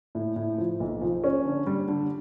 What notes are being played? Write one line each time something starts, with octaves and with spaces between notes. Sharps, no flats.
A2
A2
F3
B1
F3
C#4
D3
G3
D3